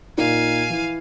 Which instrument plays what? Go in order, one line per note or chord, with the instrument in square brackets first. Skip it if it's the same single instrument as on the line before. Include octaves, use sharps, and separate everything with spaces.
[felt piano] A#2 D#4 [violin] F5 G#5
[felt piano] E3